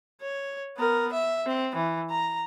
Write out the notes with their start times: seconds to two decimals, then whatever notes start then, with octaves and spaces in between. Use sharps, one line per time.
0.21 C#5
0.78 B3 A#4
1.13 E5
1.47 C4
1.76 E3
2.11 A#5